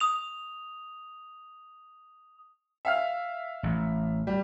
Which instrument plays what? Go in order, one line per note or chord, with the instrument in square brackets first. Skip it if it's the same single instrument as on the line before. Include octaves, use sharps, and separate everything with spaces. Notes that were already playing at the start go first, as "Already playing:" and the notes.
[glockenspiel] D#6 F7
[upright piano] E5 F5 F6
[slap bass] A1
[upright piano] G3